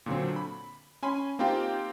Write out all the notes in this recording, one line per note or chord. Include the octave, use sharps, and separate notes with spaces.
A#2 D3 F#3 C4
B5
C#4 G#5 B5 C6
A#3 C4 D#4 F4 G4 G5